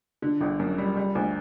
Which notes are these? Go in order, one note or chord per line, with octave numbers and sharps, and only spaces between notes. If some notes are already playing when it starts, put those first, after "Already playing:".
D3
G1
F#2
G3
G3
D2